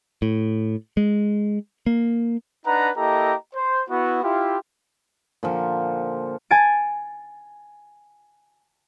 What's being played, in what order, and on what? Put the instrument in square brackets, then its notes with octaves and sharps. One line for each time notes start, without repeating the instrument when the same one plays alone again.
[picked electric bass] A2
G#3
A#3
[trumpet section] D4 D#4 B4 F#5 A#5
A#3 E4 G4 A4 D#5 A#5
C5
B3 E4 F#4
E4 F4 G4
[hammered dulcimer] A#2 D3 F3
[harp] G#5 G#6 A6 D7